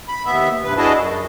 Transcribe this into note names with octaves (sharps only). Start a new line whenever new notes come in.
B5
D#2 B3 E5
G2 C3 B4
D4 E4 F#4 G#4 D#5 A5
F#2